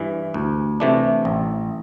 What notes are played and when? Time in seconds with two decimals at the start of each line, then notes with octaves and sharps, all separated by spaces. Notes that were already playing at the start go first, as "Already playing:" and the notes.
Already playing: G2 E3
0.34 D2
0.80 C3 E3 A3 D4
1.25 A1